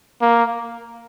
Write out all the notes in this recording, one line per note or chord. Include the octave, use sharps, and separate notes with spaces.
A#3